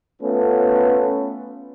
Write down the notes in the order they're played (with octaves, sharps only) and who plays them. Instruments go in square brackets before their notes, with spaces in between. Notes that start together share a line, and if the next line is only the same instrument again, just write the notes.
[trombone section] A3 B3 C#4 F4 A4 B4